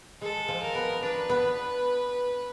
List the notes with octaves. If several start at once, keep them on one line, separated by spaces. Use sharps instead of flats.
G#3 A4
F3
A#4
B3
D4 B4
B3